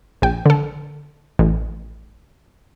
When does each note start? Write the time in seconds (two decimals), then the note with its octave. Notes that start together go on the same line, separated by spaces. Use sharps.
0.22 A#1 G5
0.46 D3 A4
1.39 A1